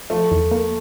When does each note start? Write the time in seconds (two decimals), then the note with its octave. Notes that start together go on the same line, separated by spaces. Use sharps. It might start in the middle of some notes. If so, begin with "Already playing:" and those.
0.10 F3 A3
0.31 E2
0.51 A#3